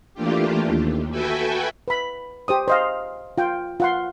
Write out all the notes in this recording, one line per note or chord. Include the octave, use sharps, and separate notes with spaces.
E3 A3 A#3 D4 F4 G4
D#2
F#4 A4 B4 E5 G5 G#5
B4 B5
G4 C5 D#6
C5 D#5 F5
F4 G5
F4 F#5 C6